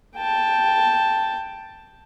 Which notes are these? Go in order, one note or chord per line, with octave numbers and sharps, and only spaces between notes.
G5 A5